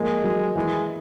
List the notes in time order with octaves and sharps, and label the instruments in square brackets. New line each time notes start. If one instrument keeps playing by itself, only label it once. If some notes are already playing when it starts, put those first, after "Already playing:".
Already playing: [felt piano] F3 A#3 [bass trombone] G#3
[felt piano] F#3
[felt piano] E3 [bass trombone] G#3